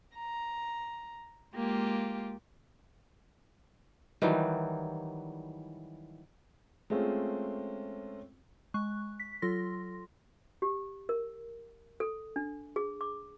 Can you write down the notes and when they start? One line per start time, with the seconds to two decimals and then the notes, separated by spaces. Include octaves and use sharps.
0.14 A#5
1.55 G#3 A#3 F4 G4
4.22 D#3 E3 F#3 G3
6.90 G#3 A3 C4 C#4 F4
8.74 G#3 C#6 F#6
9.20 B6
9.42 F#3 F4 A4 C6 A#6
10.62 G4
11.09 A#4
12.00 A4
12.36 D4
12.76 G#4
13.01 D6